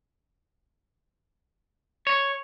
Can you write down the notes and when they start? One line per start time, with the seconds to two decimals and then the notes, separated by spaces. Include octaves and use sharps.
2.07 C#5